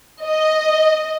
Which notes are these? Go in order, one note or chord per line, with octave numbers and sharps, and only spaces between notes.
D#5